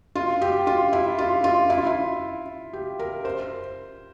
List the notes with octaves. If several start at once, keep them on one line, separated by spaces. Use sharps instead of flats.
F4
G4
F4
E4
F4
F4
E4
F4
E4
G4
A#4
C5